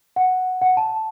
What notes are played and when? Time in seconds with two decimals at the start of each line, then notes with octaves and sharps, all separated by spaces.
0.16 F#5
0.62 F#5
0.77 A5